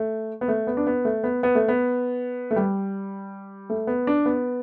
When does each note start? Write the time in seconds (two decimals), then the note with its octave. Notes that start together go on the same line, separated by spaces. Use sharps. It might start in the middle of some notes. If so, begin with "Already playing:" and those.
Already playing: A3
0.41 B3
0.48 A3
0.67 B3
0.77 D4
0.87 B3
1.05 A3
1.24 B3
1.43 B3
1.55 A3
1.68 B3
2.51 A3
2.56 G3
3.70 A3
3.87 B3
4.07 D4
4.26 B3